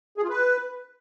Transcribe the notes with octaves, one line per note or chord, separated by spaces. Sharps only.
G#4
F4
B4